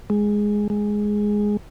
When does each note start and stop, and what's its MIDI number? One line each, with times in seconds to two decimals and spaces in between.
0.10 0.68 56
0.70 1.57 56